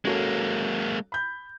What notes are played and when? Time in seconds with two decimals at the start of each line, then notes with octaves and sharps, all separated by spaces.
0.05 G#3 A#3 C#4 F#4 A4
1.12 B5 G6